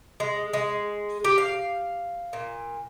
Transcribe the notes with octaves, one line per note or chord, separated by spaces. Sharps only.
G#3
G#3
G4
F5
A#2